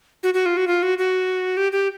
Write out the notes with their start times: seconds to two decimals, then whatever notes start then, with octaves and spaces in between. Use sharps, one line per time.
0.23 F#4
0.34 F#4
0.46 F4
0.57 F#4
0.67 F4
0.83 F#4
0.98 F#4
1.57 G4
1.72 G4